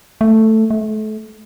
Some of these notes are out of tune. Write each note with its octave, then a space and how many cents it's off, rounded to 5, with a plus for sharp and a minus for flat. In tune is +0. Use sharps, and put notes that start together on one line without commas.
A3 +5
A3 -30